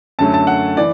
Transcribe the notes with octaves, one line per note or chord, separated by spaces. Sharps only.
F#2 D3 F#3 A3 A5
A5
F#5
E3 D5